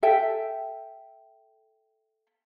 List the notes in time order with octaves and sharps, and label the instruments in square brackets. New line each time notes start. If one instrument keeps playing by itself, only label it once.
[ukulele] A4 E5 G5 G#5